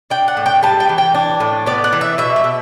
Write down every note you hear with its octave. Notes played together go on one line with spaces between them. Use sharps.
D4 G5
F#5
A2
G5
G3 A5
G5
E3
G5
D4
A2
B3 D5
F#5
E3
E5
B2 E5
E5
B2